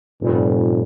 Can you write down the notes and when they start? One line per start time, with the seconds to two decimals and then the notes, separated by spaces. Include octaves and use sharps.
0.21 F1 G2 A#2 G3